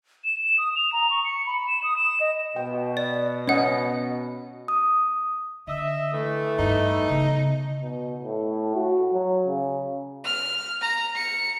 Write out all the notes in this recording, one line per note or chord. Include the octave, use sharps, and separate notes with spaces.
E7
E7
D#6
F7
A#5
C#6
C#7
B5
E7
D#6
E7
D#5
B2 G5
D5
C#4 C#5 D#5 F#5
D#6
D3 D#5 E5
E3 A3
G2 D#4
C#3 B3
B2
A2
F#4
F#3
C#3
F6
A#5
C#7